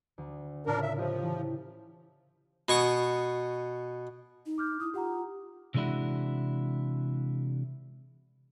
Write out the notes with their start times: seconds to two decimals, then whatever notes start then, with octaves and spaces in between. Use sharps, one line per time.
0.18 D2
0.66 A2 C#3 D4 F4 A#4
0.82 E5
0.98 F3 F4 G4 D#5
1.22 E3
2.69 B2 G#5 C#6 D#6
4.46 D#4
4.58 D6 F6 G6
4.80 E4 D#6
4.94 F4 G4 F#5 A#5
5.74 C3 E3 G#3 D4 E4 F#4